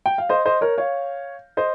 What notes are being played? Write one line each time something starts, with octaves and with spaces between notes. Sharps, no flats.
G5
F5
C5 D#5
C5 D#5
A#4 C#5
C#5 F5
C5 D#5